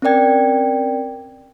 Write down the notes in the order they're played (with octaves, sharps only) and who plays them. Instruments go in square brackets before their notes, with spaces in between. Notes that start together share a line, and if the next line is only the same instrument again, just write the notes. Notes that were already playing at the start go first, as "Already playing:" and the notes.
[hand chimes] C4 C#4 A#4 D5 G5 G#6